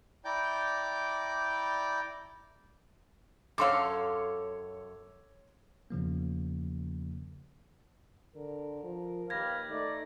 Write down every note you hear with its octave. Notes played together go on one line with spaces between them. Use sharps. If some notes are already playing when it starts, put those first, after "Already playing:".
E4 D5 G5 A#5 D6 G6
F#2 A4 C#5 F5 C6 D6
E2 C#3 F3 A#3
D3 A#4
F3
D#2 G4 B4 F5 G#6 A#6
A3 D#4 D5